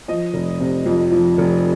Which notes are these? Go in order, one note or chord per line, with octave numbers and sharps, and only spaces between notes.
F3 D#5
F1
C3
F2
F3
F1